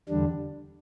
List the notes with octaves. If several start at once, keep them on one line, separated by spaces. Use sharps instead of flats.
E2 D3 G3 D4